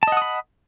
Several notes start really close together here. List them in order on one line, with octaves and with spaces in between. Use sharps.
A5 D#5 F#5 D#6 B5